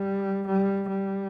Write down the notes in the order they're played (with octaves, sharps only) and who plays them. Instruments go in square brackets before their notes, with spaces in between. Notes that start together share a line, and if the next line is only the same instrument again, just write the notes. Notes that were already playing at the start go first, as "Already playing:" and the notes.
Already playing: [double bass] G3
G3
G3